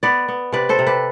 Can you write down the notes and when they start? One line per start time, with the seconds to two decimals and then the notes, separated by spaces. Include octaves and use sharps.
0.03 B3 B4 D5
0.28 B3
0.52 C3 B4 D5
0.69 A4 C5
0.79 C3
0.87 G4 B4